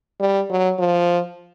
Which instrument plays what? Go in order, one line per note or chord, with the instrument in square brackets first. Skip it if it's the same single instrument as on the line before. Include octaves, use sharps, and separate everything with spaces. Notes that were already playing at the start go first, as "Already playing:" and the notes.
[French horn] G3
F#3
F3